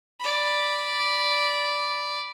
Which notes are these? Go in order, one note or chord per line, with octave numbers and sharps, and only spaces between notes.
D5 B5